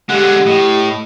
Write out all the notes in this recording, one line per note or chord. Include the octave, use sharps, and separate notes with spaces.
D3 G#3 G4 F#5
A2 D#5